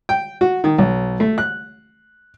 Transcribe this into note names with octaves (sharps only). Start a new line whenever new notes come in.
G5
F#4
D#3
B1
A3
F#6